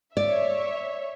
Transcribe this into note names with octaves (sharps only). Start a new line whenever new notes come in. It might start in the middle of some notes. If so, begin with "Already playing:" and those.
C#5 D5 E5